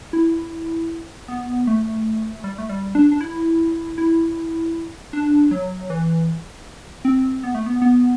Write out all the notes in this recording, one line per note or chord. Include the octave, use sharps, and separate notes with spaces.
E4
B3
A3
G3
A3
G3
D4
D4
E4
E4
D4
F#3
E3
C4
B3
A3
B3
B3